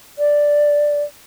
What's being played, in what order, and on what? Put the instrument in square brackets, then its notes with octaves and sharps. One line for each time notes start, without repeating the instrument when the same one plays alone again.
[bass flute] D5